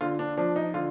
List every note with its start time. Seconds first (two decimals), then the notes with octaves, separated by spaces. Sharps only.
0.01 D3 F4
0.19 D4
0.37 F3 D4
0.56 D#4
0.74 D3 F4